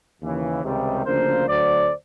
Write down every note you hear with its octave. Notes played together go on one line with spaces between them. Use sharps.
D#2 C#3 E3
C#2 C3 D#3 G3
D2 C#3 F3 A#3 D4 A#4 C5
D2 D3 F#3 C5 D5